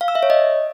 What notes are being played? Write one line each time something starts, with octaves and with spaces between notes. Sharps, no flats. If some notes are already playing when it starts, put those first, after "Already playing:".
F5
E6
E5
C#5
D#5